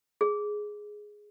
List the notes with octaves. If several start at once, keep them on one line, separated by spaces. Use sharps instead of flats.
G#4